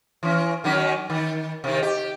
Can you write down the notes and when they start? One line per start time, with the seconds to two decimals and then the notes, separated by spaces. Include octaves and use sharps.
0.23 E3 C#4
0.64 D#3 F#3 C#4
1.10 D#3
1.64 C3 D#3
1.82 G4